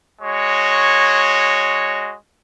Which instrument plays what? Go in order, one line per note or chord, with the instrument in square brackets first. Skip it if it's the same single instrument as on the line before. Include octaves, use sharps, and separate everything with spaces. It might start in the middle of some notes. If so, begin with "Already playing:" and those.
[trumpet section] G#3 F#4 C#5